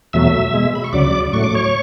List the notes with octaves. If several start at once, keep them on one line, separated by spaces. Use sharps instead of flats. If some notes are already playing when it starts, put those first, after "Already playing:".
E2 B2 F#3 A3 E5 E6
B2 G#3
B5
C#6
D2 C#3 F#3 D5 D6
A2 F#3 A3 C#6
D6
C#5 C#6